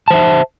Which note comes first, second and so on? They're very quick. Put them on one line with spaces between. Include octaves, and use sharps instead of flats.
A5 C5 E5